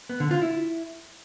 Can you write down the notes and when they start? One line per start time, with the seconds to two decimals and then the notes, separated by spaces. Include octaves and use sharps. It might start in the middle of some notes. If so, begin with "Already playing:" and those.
0.09 B3
0.20 D3
0.31 F4
0.42 E4